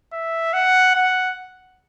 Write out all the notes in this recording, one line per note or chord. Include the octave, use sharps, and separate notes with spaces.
E5
F#5
F#5